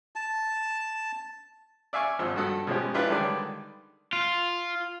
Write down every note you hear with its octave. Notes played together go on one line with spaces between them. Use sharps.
A5
D5 E5 F5 G#5 C#6
G#1 F3 E6
G2 F#4 A4 D#6
B2 F3 G#3 C#4 G4
C#4 D4 E4 F4 G4 B4
D3 D#3 G3 G#3 B4 D5
F4